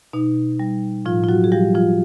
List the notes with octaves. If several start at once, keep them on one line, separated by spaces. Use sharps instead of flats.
B2 D#4
G3
A2 F3 F4
F4
F#3 F#4
G#4
F3 G3 G4
F3 F4